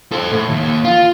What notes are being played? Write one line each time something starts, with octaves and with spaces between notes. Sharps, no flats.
A4 C5
A2
D#2
F4